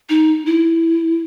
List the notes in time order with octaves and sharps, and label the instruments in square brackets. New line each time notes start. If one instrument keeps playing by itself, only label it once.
[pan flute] D#4
E4